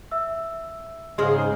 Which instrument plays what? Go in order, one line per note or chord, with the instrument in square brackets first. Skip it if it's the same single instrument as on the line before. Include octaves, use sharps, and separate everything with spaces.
[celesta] E5 E6
[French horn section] G#2 C#3 [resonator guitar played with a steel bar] G#3 G#4 C5 [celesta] C6 F6